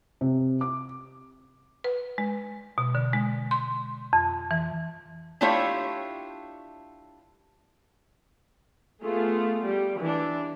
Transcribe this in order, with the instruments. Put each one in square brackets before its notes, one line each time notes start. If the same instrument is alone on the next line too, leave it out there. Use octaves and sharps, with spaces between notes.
[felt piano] C3
D6
[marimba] B4
G#3
B2
D3
G#3
C6
F2
E3
[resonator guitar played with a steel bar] A3 D4 E4 F4 G4 C#5
[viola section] A3 B3 F4 G#4
G3
E3 D4